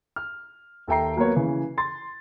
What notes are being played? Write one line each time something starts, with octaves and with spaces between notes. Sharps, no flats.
F6
D#2 A4 E5 G5 A#5 C7
F#3 A#3 B3 A#4 C#5
C#3 E3
C6 A6